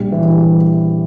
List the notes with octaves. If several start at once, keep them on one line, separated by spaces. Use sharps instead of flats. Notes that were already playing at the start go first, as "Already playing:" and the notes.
Already playing: A#1 G3
E3
G3